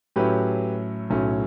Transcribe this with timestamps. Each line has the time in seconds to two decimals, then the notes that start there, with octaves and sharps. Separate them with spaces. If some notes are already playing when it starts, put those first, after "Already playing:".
0.16 A2 F#3 C#4 E4 G4 B4
1.10 B1 A2 F#3 C#4 E4